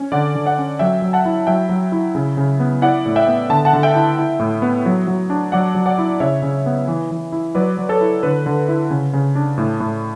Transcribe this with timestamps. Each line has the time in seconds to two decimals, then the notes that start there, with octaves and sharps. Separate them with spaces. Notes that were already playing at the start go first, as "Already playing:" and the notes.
Already playing: C#4
0.12 D3 D5 F#5
0.35 D3
0.46 D5 F#5
0.58 C#4
0.79 F#3 E5 G5
1.02 F#3
1.13 F#5 A5
1.25 E4
1.47 F#3 E5 G5
1.69 F#3
1.92 E4
2.15 C#3
2.37 C#3
2.59 B3
2.82 E4 D5 F#5
3.06 A2
3.16 E5 G5
3.27 B3
3.50 D3 A5
3.65 F#5 A5
3.73 D3
3.83 E5 G5
3.95 E4
4.18 E4
4.39 A2
4.62 B3
4.86 F#3
5.07 F#3
5.30 D4
5.52 F#3 D5 F#5
5.75 F#3
5.86 D5 F#5
5.98 E4
6.20 C#3 C#5 E5
6.42 C#3
6.66 B3
6.88 E3
7.11 E3
7.32 E4
7.55 F#3 B4 D5
7.77 F#3
7.89 A4 C#5
8.01 E4
8.23 D3 B4
8.46 D3
8.68 E4
8.90 C#3
9.13 C#3
9.35 D4
9.58 A2
9.80 A2